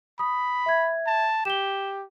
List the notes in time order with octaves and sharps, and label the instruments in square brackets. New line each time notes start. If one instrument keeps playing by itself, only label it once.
[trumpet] B5 [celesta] D#6
[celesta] E5 G#6
[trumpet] A5
[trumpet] G4 [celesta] E7 G7